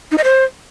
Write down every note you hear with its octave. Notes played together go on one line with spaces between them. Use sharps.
D#4
D#5
C5